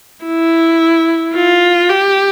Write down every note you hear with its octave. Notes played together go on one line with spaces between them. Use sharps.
E4
F4
G4